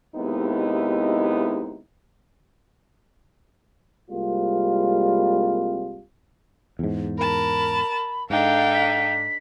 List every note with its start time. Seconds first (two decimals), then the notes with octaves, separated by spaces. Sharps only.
0.15 D#2 C3 G#3 B3 D#4 E4
4.11 C2 G3 G#3 A#3 C4 F4
6.79 E2 G#2
7.18 A#4 A5 B5
8.30 G#2 D4 D#4 A4 F5 G5
8.74 B6